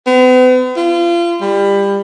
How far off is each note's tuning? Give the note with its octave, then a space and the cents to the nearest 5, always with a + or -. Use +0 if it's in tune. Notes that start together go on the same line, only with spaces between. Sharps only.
B3 +45
F4 -30
G3 +25